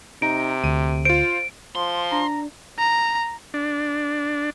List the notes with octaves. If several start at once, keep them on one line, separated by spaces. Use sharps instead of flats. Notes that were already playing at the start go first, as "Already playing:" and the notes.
C3 D#4 A#5 D7
D2 D#7
F4 C5 D7
F3 C6
D4 A#5
A#5
D4